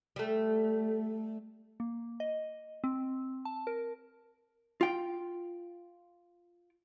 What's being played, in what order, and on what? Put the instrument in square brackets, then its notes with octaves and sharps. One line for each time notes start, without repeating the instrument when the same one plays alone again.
[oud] G3 A3
[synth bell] A#3
D#5
C4
A5
A#4
[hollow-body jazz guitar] F4 G5